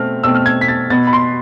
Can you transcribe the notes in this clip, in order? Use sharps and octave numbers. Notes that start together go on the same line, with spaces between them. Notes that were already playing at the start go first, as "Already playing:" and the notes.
Already playing: B2 A3 C4 F6
B2 A3 C4 E6
F6
G#6
B6
A6
B2 B3 A6
B5
C6